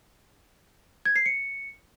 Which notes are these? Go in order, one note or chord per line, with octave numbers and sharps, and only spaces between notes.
G#6
C7
C#7